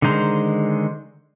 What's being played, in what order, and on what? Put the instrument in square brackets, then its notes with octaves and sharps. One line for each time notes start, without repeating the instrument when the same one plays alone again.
[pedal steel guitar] D3 D#3 G#3 C5 A#5